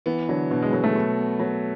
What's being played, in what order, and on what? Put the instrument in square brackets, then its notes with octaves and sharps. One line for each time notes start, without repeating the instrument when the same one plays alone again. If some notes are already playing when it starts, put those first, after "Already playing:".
[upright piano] E3 [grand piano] B3
[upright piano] D3 [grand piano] F#3
[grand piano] B2 [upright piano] D3
[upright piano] G#3
[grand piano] F#3 [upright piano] G#3
[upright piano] A3
[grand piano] B2
B3
F#3